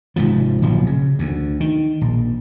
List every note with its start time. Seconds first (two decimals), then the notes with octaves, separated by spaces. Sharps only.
0.16 G#1 G#2 C3 F3
0.62 D1 A#1 F3 F#3
0.87 C#3
1.19 D2
1.60 D#3
2.01 A#1